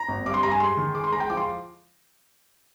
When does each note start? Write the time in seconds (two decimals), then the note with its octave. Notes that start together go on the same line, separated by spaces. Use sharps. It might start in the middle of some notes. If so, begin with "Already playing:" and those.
Already playing: A#5
0.08 G#1
0.26 G2 D6
0.34 C6
0.43 G2 A#5
0.51 G#5
0.60 G#3 C6
0.77 D#3
0.95 G#3 D6
1.04 C6
1.12 G#3 A#5
1.20 G5
1.30 F3 D6
1.37 C6